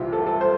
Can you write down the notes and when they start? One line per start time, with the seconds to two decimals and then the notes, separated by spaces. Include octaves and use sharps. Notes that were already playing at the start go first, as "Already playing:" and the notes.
Already playing: C2 C3 E3 F4 G4
0.13 A4
0.27 A4
0.41 C5